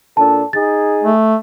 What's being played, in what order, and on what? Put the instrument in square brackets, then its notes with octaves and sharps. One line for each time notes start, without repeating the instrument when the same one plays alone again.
[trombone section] A#2 D4 A4 [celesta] A5
[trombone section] D#4 G#4 [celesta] A6
[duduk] A3